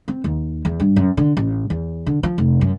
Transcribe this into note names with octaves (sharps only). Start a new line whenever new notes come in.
C4
D#2
E2
G2
F#2
D3
A1
E2
D3
F3
F1
F#2